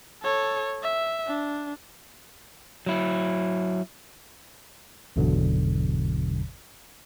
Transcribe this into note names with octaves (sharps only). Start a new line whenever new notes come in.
A4 C#5
E5
D4
F#3 E4
G#1 E2 G#2 B2 D3 F#3